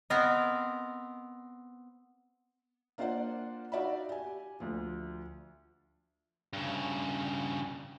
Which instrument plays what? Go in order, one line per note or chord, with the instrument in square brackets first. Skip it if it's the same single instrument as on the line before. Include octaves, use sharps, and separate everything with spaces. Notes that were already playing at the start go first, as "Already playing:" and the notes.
[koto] B3 C4 A#4 [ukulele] D#5
[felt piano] A#3 D4 F4 C5 D5 F#5
D#4 F#4 D5 E5 F5 B5
G4 G#5
D2 F3
[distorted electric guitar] G2 C#3